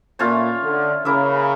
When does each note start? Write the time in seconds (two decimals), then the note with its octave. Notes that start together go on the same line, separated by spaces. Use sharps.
0.19 A#2 A3 C#4 F4 C#5
0.63 D3
1.05 C#3 A#3 E4 A#4 E5